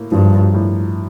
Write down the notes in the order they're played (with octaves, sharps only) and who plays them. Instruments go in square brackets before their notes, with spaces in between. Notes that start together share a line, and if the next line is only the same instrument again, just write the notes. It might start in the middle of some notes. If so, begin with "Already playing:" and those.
Already playing: [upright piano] A2 A#3
[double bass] G2 [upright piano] F3
[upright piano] A2